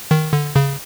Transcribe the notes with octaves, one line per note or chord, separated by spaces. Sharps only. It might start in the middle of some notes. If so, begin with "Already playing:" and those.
D#3
D3
C#3